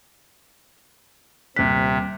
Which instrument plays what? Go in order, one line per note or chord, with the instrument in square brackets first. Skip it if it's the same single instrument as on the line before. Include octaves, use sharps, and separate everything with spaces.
[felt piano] D#1 F#6 [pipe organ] C3 [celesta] B6